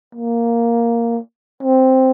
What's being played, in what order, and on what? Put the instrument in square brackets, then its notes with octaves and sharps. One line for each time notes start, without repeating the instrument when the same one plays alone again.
[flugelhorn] A#3
C4